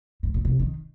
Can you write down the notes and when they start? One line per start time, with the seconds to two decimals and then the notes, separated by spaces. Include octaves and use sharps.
0.23 G#2
0.34 A#2
0.45 C3
0.60 D#3